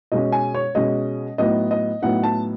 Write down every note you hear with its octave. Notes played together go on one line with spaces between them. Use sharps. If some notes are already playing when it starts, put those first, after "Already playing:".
B2 G#3 C#4 D#5
G#5
C#5
B2 G#3 C#4 D#5
A2 F#3 B3 D#4 D#5
D#5
A2 F#3 B3 D#4 F#5
A5